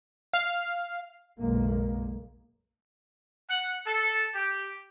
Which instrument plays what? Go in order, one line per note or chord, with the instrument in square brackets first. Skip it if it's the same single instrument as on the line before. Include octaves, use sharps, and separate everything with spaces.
[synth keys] F5
[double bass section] F#1 B1 G#3 A#3
[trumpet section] F#5
A4
G4